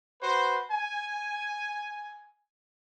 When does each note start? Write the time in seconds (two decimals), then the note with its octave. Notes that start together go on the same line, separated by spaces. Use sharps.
0.21 F#4 B4 C5
0.70 G#5